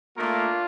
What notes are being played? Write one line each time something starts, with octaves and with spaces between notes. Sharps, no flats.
A3 A#3 D4 F4 A#4